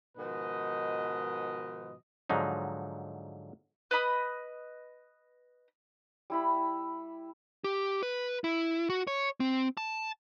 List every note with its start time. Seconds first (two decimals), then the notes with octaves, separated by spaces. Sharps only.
0.17 G#2 B2 D#3 F3 B4 D#5
2.30 G#2 D3 F3 F#3 D#4
3.91 B4 D#5 B5 D#6
6.30 G3 E4 B5
7.64 G4
8.03 B4
8.44 E4
8.90 F#4
9.07 C#5
9.40 C4
9.77 A5